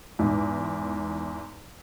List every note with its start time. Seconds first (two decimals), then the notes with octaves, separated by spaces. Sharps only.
0.19 E2 G#2